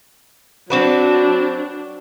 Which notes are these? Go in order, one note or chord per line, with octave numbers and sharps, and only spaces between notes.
F#3 C4 D4 F#4 B4